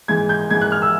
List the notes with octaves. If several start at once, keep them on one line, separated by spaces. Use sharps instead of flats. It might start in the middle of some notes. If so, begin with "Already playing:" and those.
G#2 E3 G#6
G6
G#2 E3 G#6
F#6
F6
E6